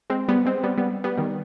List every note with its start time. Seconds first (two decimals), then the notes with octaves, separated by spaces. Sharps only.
0.10 G#3 C4
0.28 G3 B3
0.45 G#3 C4
0.63 G3 B3
0.77 G3 B3
1.04 G3 B3
1.17 D#3 G3